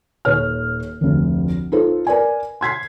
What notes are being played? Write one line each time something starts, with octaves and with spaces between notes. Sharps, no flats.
D#1 B4 C#5 F6
F1 D2
D#4 F4 A4 B4 C5
A#4 B4 D5 G#5
C6 G#6 B6 C7